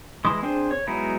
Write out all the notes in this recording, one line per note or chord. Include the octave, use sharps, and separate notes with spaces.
E3 G#3 E4 C6 D#6
C4 D4 G#4 C5
C#5
F#3 G#3 B3 D#4 E4